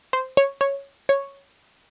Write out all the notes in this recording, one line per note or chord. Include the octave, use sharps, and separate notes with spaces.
C5
C#5
C#5
C#5